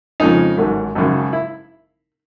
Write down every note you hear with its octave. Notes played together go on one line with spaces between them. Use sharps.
F2 C#3 F3 G#3 D#4
A1 G#2 D#3 F#3 A3
G#1 F#2 C#3 F#3
E4